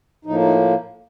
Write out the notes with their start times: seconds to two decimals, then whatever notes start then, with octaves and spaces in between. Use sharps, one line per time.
0.25 A2 F3 A#3 D#4
0.41 D#4